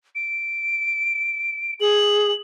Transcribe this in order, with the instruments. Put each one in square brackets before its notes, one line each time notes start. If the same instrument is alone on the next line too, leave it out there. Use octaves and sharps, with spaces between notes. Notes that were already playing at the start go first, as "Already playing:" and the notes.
[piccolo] D7
[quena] G#4 [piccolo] F#7